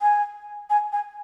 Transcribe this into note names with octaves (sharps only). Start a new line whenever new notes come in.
G#5
G#5
G#5